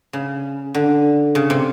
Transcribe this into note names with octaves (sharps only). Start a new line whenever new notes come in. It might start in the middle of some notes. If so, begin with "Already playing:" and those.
C#3
D3
C#3
C3